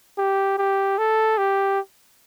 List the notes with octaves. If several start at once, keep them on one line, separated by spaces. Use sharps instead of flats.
G4
G4
A4
G4